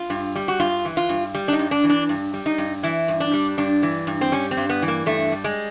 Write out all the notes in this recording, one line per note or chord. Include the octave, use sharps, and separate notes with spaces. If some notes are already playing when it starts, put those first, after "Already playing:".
Already playing: F4
G2
G3
F#4
G2 F4
E3
F4
G2
G3
D4
D#4
G2
D4
E3
D4
G2
G3
D#4
G2
E3 E4
G2
D4
G3
G2 D4
E3
G2
C4
G3 C#4
C4
G2
B3
E3
A#3
G2 A3
G3
G#3